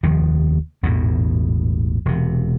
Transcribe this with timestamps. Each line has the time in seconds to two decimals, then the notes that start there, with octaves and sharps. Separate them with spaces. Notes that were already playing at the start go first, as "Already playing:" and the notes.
0.03 F1 D#2 D#3 F3
0.83 A1 E2 G#2 B2
2.05 E1 C3